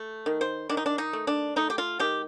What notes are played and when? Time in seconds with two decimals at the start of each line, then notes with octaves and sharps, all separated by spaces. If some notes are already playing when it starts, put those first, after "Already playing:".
Already playing: A3
0.26 D#3
0.41 C5
0.69 D#3 D4
0.77 D#4
0.86 D4
0.98 D#4
1.13 A3
1.27 D4
1.56 A3 D#4
1.70 G4
1.78 F4
1.99 D#3 G4